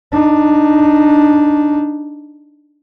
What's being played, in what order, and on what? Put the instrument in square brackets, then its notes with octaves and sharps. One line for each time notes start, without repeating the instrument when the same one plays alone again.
[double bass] D4 D#4